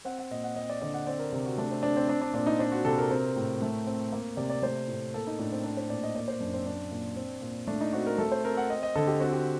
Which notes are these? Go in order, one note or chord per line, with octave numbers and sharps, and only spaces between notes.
C4 F#5
F#5
A#2 D#5
F#5
C4 D#5
D5
D3 D5
F#5
C4 D5
A#4
C3
F#4
A3 D4
C4
C4 D4
C4
C4 D4
D4
A#2 D4
D#4
C4 D4
F#4
C3 A4
A#4
C4
A2
A3
C4
A#3
C3 D5
D5
A3 C5
A2
A#3 A4
D#4
A2 D4
C4
C4 D4
C5
A#2 D5
D#5
A#3 D5
C5
F#2 D4
C4
C4 D4
A#2
C4
A#2
A3 D4
D#4
C4 F#4
A#4
A3 A4
C5
C4 A#4
F#5
C4 D#5
D#5
D3 A4
G4
C4 F#4
G4